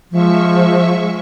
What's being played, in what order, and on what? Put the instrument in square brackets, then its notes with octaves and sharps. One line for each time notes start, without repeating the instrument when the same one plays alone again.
[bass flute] F3 [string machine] G#3 E5 C#6